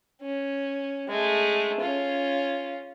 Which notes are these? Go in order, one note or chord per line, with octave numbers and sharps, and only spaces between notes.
C#4
G#3 A3
C#4 F4